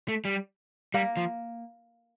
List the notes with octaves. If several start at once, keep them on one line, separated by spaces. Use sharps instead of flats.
A3
G3
G3 A#3
F3